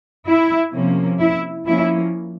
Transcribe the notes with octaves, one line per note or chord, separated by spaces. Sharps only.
E4
C3 F3 A#3 C#4
E4
F3 A#3 C#4 E4